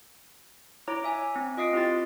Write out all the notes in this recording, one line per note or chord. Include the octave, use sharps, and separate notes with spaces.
E4 C#5 A#5 D6
E5 G#5
C4
F4 D#5 D#6 B6 C7 D7
C4 E4 G4 C6 A6